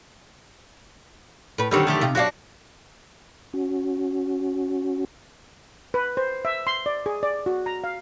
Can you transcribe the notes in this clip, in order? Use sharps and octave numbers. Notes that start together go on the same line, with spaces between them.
A2 B4
F#2 D3 D#3 G3 C4 C#5
F3 A3 G4
C3 D#4 F4
F#2 D4 F#4 G4 F5
C#4 F#4
B4
C5
E5
C6
D5
G#4
D5
F#4
A#5
F5